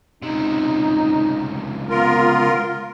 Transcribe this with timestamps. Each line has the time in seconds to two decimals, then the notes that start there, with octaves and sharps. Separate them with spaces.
0.23 C#2 C3 D#4
1.90 B3 F4 A#4